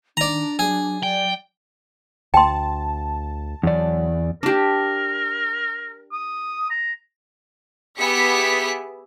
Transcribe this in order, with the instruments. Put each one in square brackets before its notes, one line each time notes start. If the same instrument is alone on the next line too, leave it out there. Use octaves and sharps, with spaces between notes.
[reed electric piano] D#3 [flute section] D4 [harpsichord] D5 A#5
[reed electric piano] F#3 [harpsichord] G#4
[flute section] D5 [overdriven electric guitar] G5
[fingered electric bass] D2 [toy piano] G5 C6 [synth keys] A5
[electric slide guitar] E2 D5 [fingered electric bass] F#3
[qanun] D4 G4 [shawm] A#4
[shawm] D#6
A#5
[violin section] B3 G4 G#4 E5 B6 C#7